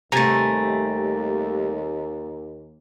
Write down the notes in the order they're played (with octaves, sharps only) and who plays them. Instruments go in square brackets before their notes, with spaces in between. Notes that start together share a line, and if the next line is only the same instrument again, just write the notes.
[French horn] D#2 [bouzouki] C3 G#5 [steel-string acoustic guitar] G3 A3 [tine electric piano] A#5 A6